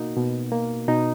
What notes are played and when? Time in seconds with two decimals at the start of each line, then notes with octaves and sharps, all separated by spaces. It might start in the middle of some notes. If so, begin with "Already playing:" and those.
Already playing: B2 A#3 D#4 F#4
0.16 B2
0.52 A#3
0.88 B2 D#4